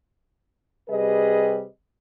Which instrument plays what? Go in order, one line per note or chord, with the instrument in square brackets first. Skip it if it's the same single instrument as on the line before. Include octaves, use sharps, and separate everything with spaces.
[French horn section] C3 G3 G#4 B4 D#5